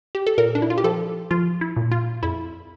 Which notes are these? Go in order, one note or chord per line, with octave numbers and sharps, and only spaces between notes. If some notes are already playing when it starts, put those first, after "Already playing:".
G4
A4
A#2 A#4
D4
E4
F4
G4
F3 A4
F3 F4
E4
A#2
F4
F2 E4